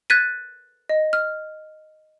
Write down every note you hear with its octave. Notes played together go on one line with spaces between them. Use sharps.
F#6 G#6 A6 B6 D#7
D#5
F6